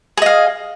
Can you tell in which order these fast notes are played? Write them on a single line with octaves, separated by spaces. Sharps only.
G#4 D#5 F5